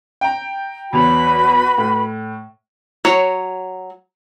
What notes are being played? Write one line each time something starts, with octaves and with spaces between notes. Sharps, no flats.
G5 A#5
E2 F#3 F#4 B4 B5 F7
A2
F#3 C#5